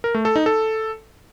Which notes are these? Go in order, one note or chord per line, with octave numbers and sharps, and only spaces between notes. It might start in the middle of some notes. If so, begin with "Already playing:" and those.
A#4
A3
A4
D#4
A4